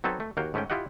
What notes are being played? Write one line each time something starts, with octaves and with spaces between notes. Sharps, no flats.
F#3 C4 D#4 A4 B4 C#5
A3
D#2 A#3 F#4 F5 G5
G#2 A3 C#4 G5
E4 F4 G4 D#5 F#5